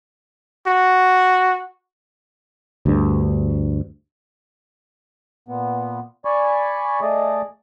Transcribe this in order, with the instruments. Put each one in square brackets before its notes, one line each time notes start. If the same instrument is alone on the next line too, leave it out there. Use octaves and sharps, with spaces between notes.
[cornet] F#4
[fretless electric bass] D2 G2
[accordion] A#2 B3
D5 G#5 B5 C#6
A3 G#4 D5 D#5